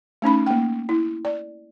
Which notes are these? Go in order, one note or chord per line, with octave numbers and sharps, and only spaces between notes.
A3 C#4 D#4 B5
A#3 G5
E4
D5